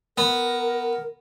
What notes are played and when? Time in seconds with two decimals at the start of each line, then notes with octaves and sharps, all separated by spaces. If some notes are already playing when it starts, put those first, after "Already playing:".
0.18 B3 A#4